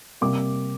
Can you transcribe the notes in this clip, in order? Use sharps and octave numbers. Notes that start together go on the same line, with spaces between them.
C3 G3 A#3 D6